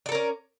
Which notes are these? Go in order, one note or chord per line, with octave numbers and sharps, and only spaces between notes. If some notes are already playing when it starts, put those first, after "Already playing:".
C#4 A4 A#4 D5